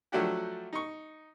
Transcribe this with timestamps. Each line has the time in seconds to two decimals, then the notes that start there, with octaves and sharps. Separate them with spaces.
0.12 F3 F#3 A3 D4 F#4 G4
0.73 D#4 C#6